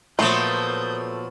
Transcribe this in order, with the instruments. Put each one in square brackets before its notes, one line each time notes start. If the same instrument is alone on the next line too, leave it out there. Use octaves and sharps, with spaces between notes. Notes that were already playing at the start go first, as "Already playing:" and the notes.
[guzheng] A#2 B3 C5 [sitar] F3 F#3 [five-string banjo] A3 [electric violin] D#6 G6